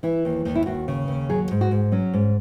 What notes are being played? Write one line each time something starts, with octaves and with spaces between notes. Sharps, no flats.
E3 E4
D#2
D#2
E4
D#2 F#4
C#3
D#2
F#3 G#4
G#2
F#4
G#2
F#3 C#4
G#2